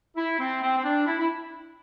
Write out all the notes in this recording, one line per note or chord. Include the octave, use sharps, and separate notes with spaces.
E4
C4
C4
C4
D4
E4
E4